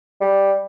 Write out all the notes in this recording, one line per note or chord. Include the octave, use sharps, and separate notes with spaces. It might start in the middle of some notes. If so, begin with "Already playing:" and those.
G3